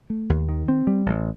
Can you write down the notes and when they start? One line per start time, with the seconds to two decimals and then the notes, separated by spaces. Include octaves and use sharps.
0.10 A3
0.30 D#2
0.49 D#3
0.68 C4
0.87 G3
1.06 A1